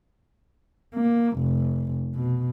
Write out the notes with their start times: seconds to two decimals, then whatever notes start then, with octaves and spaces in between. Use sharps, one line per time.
0.95 A#3
1.39 F1
2.15 B2